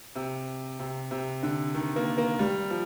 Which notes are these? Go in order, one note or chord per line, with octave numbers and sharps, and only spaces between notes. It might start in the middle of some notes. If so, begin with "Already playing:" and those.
C3
C3
C3
D3
D#3
A#3
A#3
G3
F3